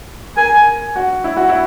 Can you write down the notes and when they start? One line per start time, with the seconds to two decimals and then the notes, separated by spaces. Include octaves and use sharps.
0.37 A#4 G#5
0.96 F#4
1.24 E4
1.37 F#4
1.49 E4